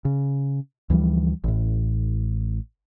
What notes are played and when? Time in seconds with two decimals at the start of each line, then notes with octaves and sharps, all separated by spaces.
0.05 C#3
0.90 D2 E3 F3 G3
1.44 A1 A2